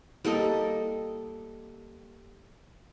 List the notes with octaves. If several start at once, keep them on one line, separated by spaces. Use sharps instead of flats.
G3 A#3 A4 D#5